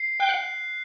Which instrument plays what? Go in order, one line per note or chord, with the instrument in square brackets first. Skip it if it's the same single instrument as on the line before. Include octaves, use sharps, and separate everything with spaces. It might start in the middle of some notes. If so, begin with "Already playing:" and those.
Already playing: [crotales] C7
[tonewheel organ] G5 [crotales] F#6
[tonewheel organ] F#5